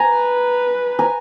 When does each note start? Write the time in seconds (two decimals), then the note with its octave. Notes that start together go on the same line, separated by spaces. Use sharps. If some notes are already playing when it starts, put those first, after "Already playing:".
Already playing: G#5 A#5
0.09 B4
0.99 G#5 A#5